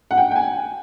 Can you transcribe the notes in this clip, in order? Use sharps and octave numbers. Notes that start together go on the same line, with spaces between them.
F#5
G5
G5
G#5